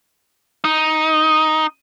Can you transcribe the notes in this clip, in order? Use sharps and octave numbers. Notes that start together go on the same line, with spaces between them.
D#4